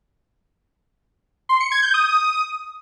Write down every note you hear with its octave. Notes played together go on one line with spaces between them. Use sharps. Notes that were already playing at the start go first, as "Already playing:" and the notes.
C6
C#7
G#6
G6
D#6